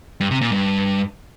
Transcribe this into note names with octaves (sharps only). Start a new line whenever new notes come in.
G2
C3
A#2
G2